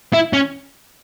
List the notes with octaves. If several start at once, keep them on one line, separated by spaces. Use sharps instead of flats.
E4
C#4